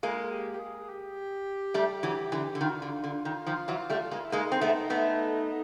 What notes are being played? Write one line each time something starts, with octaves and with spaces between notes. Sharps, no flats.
G#3 A#3 F4
G4
G4
G#4
G4
G3 A3
E3 F#3
D3 E3
D3
D#3 F4
F#4
D3 F4
D3
D#3
D#3 F3
E3 F#3
G3 A3
G#3 A#3
E4
G#3 A#3 D#4
C4
A3 B3
A3 B3